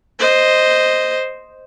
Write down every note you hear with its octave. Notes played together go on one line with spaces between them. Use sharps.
C5 D#5